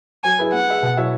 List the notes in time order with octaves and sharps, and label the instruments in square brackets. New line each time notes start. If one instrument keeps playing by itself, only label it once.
[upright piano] F#3 [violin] G#5
[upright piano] E4 G#4 B4
[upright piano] B3 [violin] F#5
[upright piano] G#4 E5
B2
F#3 E4 C#5 E5